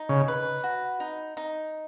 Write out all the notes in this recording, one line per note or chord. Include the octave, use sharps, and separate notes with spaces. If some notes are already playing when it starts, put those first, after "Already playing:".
Already playing: D#4
C#3
B4
F#4
D#4
D#4